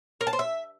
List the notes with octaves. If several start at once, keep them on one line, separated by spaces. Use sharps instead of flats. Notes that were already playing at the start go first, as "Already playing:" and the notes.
A#4
A5
C5
E5